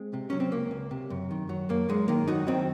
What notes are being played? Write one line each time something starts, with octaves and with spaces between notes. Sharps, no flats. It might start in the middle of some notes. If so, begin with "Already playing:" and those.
Already playing: G#3 C4
C3
F#3 C#4
C4
C#2 A#3
C#2
C3
F#2
D#3
F#3
F#2 A#3
F#2 G#3
D#3 A#3
F#2 D#4 F#4
D#3 C4 D#4